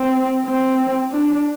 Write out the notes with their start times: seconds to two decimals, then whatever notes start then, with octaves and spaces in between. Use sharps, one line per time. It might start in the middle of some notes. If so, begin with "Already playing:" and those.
Already playing: C4
0.45 C4
1.11 D4